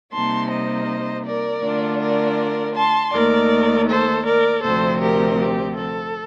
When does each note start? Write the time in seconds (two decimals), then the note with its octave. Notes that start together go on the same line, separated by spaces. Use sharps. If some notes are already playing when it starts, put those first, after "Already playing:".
0.12 C3 G3 A#3 D#4 A5 C6
0.50 C5 D#5
1.25 A#4 D5
1.63 D3 A3 D4 F4
2.00 A#4 D5
2.76 A5 C6
3.13 D#2 D#3 A3 A#4 D5
3.89 A4 C5
4.26 A#4 D5
4.63 D2 C3 F3 C4 A4 C5
5.02 G4 A#4
5.39 G4
5.77 A4